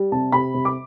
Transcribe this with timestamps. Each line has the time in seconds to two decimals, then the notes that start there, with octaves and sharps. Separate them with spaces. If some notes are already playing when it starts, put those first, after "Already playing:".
Already playing: G3
0.12 C3 A5
0.32 C3 B5
0.54 C3
0.65 D6